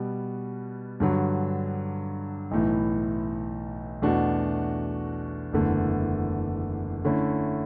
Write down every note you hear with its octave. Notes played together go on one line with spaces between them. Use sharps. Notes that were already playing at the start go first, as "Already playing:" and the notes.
Already playing: B2 G3 B3
G2 D3 F#3
B1 A2 E3
E2 B2 A3 D4 F#4
F#1 E2 D3 A3
D3 A3 C#4 E4